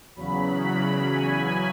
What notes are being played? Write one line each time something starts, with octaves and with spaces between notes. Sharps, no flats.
E2 C#3 F#3 B5
G#5